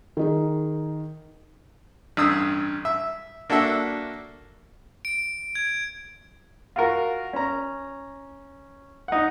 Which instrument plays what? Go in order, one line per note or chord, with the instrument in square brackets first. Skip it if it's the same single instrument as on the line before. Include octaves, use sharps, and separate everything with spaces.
[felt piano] D#3 D#4 G#4
[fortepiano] A1 G2 D#6 E6
E5
A#3 D4 F#4 A4 E5
[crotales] D7
G#6
[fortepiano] F4 F#4 A#4
C#4 A#5
D#4 F#5